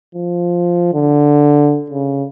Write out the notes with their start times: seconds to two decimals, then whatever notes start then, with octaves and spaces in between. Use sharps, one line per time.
0.15 F3
0.94 D3
1.90 C#3